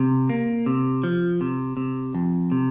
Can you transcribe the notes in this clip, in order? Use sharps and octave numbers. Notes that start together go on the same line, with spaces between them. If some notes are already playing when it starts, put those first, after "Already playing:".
Already playing: C3
A#3
C3
F3
C3
C3
F2
C3